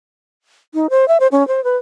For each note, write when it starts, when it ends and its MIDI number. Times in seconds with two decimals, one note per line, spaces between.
0.74 0.87 63
0.90 1.07 72
1.08 1.17 76
1.20 1.27 72
1.32 1.46 61
1.48 1.63 72
1.64 1.76 71